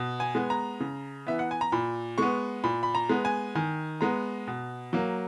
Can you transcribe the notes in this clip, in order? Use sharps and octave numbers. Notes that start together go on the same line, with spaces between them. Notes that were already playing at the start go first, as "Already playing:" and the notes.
Already playing: B2
G#5
G#3 B3
A#5
C#3
E3 B3 E5
F#5
G#5
A#5
A#2 B5
G#3 B3 C#6
A#2 B5
B5
A#5
G#3 B3
G#5
D#3 G#5
G#3 B3 A#5
B2
F#3 A#3